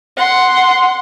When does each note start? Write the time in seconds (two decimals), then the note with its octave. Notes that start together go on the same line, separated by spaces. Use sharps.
0.17 F#5 C6